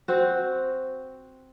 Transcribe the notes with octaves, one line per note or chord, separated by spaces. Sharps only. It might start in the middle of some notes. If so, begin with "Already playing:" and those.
C4 F#4